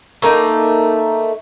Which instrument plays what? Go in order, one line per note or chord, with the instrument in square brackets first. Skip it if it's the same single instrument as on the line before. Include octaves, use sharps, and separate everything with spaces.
[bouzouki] A3 A#3 D#4